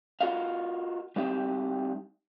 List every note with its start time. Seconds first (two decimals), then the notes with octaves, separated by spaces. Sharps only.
0.21 F4 F#4 A#4 D#5 F5
1.16 G3 C4 D#4 G4 E5